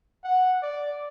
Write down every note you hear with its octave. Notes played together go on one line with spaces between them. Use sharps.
F#5
D5